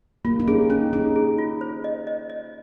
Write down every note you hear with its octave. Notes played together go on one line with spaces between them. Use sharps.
A#3 F4
D#4
C#4 G#4
C#4 D#4
D#4 G#4
G#4
F4
C5
D#5
D#5
D#5